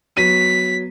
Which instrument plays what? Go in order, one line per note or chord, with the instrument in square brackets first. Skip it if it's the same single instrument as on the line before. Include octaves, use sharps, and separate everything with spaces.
[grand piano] F#3 B3 D#7 [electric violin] B6